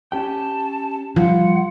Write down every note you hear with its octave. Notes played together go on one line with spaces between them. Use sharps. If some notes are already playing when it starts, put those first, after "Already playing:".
C#4 G4 G5 A5
F3 G3 F4 F#5